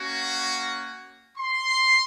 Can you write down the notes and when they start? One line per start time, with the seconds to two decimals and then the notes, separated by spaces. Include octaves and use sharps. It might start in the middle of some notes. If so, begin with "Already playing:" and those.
Already playing: A#3 C#4 F#4
0.21 C#6
1.38 C6